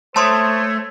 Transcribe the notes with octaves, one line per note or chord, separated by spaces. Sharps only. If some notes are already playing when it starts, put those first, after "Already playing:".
A3 C5 C#5 A5 C6 D#6